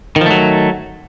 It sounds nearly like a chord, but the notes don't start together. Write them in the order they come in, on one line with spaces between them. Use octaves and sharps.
D#3 F3 A3 F#3